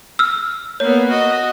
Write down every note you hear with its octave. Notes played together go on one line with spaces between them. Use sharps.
E6 F6
A#3 B3 C#5
F#4 D#5